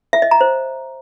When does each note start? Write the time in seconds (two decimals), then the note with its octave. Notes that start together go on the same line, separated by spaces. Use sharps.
0.13 E5
0.22 D#5
0.31 A#5
0.41 C5